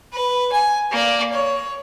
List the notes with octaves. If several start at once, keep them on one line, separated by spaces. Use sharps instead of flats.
B4
G#5
A#3 D5
C#5